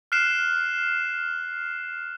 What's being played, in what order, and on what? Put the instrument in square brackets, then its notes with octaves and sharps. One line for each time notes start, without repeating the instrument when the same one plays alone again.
[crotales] F6 F#6 C7 E7